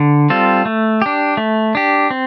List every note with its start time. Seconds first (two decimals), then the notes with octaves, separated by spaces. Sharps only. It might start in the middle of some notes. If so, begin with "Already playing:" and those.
Already playing: D3
0.30 G3 C4 F4 A4
0.66 A3
1.02 D4 G4
1.37 A3
1.75 D4 G4
2.11 C4